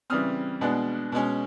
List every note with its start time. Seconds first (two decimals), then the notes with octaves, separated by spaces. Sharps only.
0.10 C#3 E3 G3 C4 D#6 F6
0.61 B2 G#3 B3 D4
1.12 B2 G#3 C#4